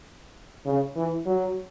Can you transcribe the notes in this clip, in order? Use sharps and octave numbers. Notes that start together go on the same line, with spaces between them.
C#3
E3
F#3